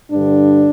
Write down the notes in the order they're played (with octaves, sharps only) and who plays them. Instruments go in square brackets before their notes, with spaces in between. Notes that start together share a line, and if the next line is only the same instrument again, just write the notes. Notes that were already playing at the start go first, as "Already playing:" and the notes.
[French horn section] G2 D3 D4